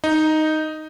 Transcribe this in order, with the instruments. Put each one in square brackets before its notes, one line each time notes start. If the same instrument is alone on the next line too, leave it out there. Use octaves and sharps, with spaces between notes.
[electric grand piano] D#4